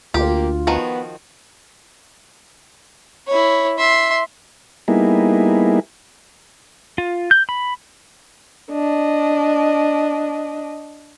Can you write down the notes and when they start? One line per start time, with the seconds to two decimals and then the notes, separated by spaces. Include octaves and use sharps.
0.14 D2 A#3 F4 G4
0.67 D#3 F3 B3 F#4
3.27 E4 C#5
3.79 E5 C6
4.88 G3 A#3 B3 D#4 E4 G#4
6.98 F4
7.31 G6
7.49 B5
8.71 D4 D#5